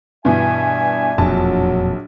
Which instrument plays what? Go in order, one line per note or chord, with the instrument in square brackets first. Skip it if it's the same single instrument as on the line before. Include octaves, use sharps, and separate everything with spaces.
[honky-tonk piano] G2 B2 E3 [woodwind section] D4 E5 G#5
[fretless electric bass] E1 F2 A#2 [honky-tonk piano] A#1 A5 [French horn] F#3